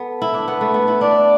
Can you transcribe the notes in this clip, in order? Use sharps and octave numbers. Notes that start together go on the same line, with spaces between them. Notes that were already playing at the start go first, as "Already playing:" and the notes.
Already playing: B3 A4
E4
D4
B3 B4
A3
B3
E4
D4 D5